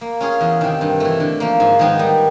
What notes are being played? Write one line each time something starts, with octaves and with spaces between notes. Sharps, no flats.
A#3
C#4 F4 G#4 C#5
E2
C3 D#3
G2
E3 A3
D3
F3 A#3
G#2
D#3 G#3 B3 D#4
G3